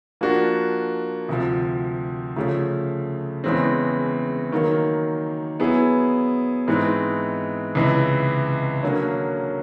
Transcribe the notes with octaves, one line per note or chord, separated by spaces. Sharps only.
F3 A#3 D4 F#4
D2 C3 F3
C#3 F3 A3
E2 C#3 E3 G#3 C4
D#3 F#3 A#3
F#3 B3 E4 G#4
G#2 E3 G#3 C4 D#4
C#2 C3 E3
D3 F#3 A#3 C#4